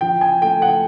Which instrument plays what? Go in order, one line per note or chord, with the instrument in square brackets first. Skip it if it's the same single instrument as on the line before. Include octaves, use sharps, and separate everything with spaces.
[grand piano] F3 G5
G#5
A3 G5
F#5